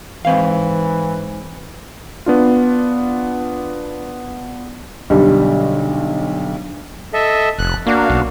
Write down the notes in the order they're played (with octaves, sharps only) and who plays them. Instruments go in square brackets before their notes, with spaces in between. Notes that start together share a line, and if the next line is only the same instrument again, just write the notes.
[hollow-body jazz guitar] G#2 C4 F5 [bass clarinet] E3
[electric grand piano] B3 D4 F4
[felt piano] B1 D3 G3
[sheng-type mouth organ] A4 D#5 E5
[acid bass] F1 [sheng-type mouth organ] F#6
[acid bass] A#3 [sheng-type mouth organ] D4 F#4 F5
[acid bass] B1